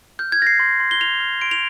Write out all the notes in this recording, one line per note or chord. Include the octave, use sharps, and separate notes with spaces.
F6 G6
G#6
F6 A#6
C7
C6
C6
G7
F6 F7
F6
C6 D7
F7